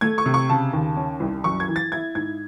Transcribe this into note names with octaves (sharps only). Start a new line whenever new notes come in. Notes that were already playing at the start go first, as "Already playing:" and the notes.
A3 G#6
C#6
C3
C#6
C#3 A5
D#2
C#4
C2
F#2 C#6
G#6
E3
A6
E4 G#6
G#2 G#6